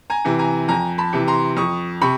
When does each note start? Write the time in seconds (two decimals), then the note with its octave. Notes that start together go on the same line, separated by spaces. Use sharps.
0.10 G#5 A#5
0.25 C3 E3
0.39 G#5 A#5
0.68 F2 G#5 A#5
0.98 A5 B5
1.13 C3 E3
1.27 A#5 C6
1.57 F2 C#6 D#6
2.02 C3 B5 C#6